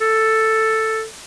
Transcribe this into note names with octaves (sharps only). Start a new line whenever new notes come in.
A4